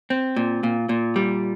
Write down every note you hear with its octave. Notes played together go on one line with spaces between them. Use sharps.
C4
A#2
A#2
A#2
G3